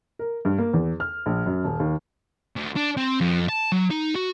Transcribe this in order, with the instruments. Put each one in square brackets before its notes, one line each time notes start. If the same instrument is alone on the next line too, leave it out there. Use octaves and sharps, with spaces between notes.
[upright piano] A#4
G2
A#3
E2
F6
A#1
F#2
D#1
D#2
[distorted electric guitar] D2
D4
C4
F2
A5
F#3
D#4
F#4